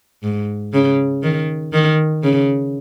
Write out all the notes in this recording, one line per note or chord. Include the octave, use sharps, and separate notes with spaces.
G#2
C#3
D#3
D#3
C#3